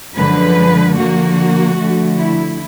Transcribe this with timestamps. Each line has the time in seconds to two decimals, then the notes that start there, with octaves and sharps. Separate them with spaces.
0.15 F#2 D3 F3 G#3 B4
0.96 D3 F3 A#3 F#4
1.77 D3 F3 A3
2.18 E4